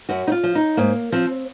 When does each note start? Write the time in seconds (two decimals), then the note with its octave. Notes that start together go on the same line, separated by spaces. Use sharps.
0.09 F#2 F#4
0.27 D#4
0.32 F4
0.43 F3
0.55 D#4
0.77 G#2 A#3
1.12 F3 C4